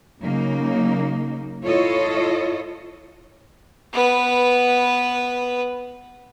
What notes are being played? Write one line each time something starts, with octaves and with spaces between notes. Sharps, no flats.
C#3 F#3 A#3 D#4
E4 F4 A4 C#5 D#5
B3 B4